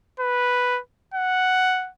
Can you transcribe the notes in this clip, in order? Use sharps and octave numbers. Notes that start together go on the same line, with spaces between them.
B4
F#5